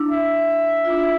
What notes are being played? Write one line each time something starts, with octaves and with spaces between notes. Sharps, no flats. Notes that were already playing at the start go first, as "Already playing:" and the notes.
Already playing: D4 E4
E5
F4
D4 E4